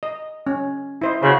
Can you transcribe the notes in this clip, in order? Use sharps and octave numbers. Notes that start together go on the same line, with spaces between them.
D#5
C#4
E4 C5 D#5
C#3 F#4 C5